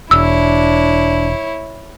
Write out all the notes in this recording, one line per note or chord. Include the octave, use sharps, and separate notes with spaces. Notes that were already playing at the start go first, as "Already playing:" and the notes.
E1 D4 E4 C#5 E6